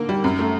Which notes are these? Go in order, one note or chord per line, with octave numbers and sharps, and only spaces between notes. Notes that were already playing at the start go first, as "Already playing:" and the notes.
Already playing: D3 A#3
G3
F#2
A3